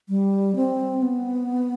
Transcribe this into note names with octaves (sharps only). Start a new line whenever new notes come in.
G3
C4
B3